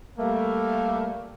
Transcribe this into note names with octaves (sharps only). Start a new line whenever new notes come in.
G3 A3 A#3